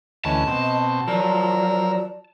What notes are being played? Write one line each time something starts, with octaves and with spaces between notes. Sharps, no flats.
D2 E3 C#4 D#5 A5
B2 C4
F3 F#3 A#4 D5 E6